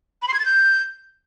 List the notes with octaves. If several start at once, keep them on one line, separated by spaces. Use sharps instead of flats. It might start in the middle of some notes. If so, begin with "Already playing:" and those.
B5
C6
G#6
A6
G6